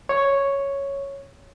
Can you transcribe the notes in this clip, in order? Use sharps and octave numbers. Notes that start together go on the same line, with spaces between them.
C#5